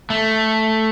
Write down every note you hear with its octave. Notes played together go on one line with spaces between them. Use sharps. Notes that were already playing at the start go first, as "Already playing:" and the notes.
A3